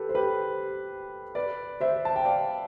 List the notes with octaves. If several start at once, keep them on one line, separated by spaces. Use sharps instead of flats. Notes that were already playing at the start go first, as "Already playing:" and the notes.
Already playing: G4 A4 B4
C5
G4 B4
B4 D5
C5 E5
A5
G5
D5 F5